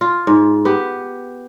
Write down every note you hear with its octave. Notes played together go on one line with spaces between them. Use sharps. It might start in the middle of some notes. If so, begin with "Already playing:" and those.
F4
G#2
B3 G4